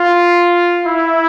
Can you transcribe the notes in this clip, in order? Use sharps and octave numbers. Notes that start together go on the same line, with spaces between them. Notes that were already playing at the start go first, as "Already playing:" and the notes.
Already playing: F4
E4